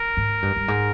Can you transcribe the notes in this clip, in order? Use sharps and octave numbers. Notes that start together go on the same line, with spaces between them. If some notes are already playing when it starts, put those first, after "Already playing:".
Already playing: A#4
G#2
G2
G2
G#2